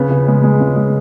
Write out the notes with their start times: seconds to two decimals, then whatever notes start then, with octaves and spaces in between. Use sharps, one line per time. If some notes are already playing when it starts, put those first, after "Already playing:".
Already playing: C#3 B3
0.11 C#3
0.28 G#3
0.43 G#3
0.60 C#3
0.76 G#3